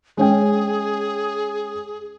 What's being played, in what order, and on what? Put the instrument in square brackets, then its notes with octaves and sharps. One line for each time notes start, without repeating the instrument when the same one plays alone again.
[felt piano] G#3 C#4 G5 [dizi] G#4